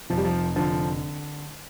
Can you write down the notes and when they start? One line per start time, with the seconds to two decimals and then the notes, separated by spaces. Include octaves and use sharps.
0.10 F1 F3
0.18 G3
0.25 F3
0.56 D3 F3